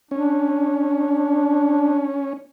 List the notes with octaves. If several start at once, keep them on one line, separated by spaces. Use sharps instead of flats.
C#4 D4